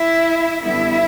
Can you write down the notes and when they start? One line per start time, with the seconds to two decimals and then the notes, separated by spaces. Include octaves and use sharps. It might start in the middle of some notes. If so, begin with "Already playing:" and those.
Already playing: E4 E5
0.64 F#2 D3 G3 B3 E4 E5